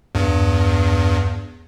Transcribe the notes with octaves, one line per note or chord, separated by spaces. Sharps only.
E2 G2